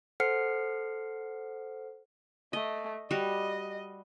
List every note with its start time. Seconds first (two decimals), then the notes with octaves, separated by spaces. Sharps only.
0.20 A4 C5 F#5 F6 C7 C#7
2.53 A3 D#5
3.11 G3 F#4 D#5